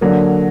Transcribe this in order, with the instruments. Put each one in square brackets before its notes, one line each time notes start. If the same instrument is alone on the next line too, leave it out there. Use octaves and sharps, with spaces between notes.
[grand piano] D3 F#3 A#3